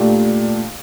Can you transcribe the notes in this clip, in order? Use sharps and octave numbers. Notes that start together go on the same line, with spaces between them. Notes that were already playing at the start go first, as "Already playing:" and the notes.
Already playing: A#2 A3 D4 G4